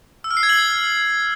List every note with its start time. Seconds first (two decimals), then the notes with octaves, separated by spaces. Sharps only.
0.24 E6
0.31 F6
0.37 C7
0.43 G#6
0.49 F#7